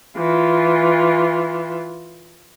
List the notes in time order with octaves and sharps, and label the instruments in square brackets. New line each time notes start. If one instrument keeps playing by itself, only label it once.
[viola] E3 F4